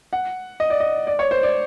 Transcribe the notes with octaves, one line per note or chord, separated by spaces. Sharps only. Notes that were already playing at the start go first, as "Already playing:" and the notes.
F#5
D#5
D5
D#5
D5
C#5
C5
D5